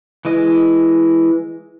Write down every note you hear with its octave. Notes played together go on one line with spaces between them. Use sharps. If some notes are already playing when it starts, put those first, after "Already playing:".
E3 G#3 D#5